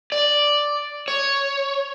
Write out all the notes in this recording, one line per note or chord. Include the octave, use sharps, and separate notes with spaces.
D5
C#5